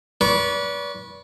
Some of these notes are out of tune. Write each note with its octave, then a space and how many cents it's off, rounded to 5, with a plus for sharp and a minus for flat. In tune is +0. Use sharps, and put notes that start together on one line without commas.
B4 -25 D5 -35 C#6 -20